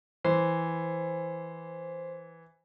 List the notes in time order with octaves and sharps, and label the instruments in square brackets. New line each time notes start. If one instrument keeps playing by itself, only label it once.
[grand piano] E3 [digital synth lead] C5